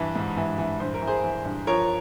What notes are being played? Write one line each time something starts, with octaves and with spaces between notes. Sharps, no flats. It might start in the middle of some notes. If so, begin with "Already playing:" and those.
Already playing: G2 E3
G#2
E3
E3
G2 C5
A#4
E3
G#4 C5
E3
G2
F3 A#4 C#5